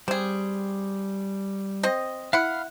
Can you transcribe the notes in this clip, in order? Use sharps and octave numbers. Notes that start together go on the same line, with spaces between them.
G3 C4 G#4
C4 D#5
E4 F5 F#5 B5 F6